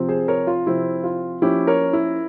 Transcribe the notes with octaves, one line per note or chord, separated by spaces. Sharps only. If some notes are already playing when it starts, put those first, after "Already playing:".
Already playing: C3 F3 C4
G#4 C5
A#4 C#5
F4
C3 F3 C4 E4
F4
F3 A#3 C#4 E4 G4
A#4 C#5
E4